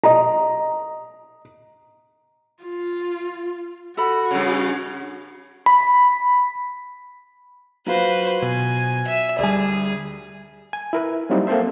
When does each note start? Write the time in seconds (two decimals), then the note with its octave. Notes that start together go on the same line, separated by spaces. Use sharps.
0.04 D#5 A#5
2.63 F4
3.97 F#4 A4 B5
4.31 G2 C#3
5.66 B5
7.87 F#3 F4 F#4 B4 C5
8.42 B2 G#5
9.08 E5
9.39 D2 G3 G#4 D5 G#5
10.73 G#5
10.93 E4 A#4 B4
11.30 F#3 G3 A#3 C4 D#4 E4
11.47 A#3 C4 A4 C5 E5